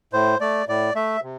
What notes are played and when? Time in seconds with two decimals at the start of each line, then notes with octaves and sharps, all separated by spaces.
0.13 A2 C5
0.41 A3 D5
0.68 A2 D5
0.95 A3 E5
1.23 C3